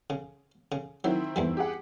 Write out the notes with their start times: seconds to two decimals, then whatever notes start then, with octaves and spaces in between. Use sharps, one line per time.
0.10 C#3
0.72 C#3
1.04 D#3 F#3 C4 E4
1.36 E2 G2 G3
1.57 G4 G#4 F#5